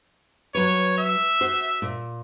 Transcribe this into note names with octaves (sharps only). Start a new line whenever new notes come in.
F#3 B4 C#5
E5
F#4 C5
A#2